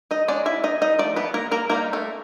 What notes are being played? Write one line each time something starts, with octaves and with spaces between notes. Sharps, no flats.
D#4 D#5
G#3 C#4 D4 D5
E4 E5
D#4 D#5
D#4 D#5
F3 A3 D5
B3 B4
A#3 A#4
A#3 A#4
G3 A#3 C4 D#4 A#4
A3 A4